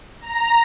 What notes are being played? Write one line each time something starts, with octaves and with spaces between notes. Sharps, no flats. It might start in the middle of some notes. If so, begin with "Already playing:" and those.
A#5